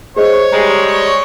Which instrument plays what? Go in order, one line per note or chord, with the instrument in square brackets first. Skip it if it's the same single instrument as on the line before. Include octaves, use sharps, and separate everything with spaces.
[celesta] G#4 C5 D#5 [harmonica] C#5
[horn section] G3 G#3 [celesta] A#5
[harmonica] C#5